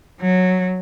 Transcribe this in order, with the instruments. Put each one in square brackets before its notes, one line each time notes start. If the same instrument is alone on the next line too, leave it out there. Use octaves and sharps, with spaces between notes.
[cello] F#3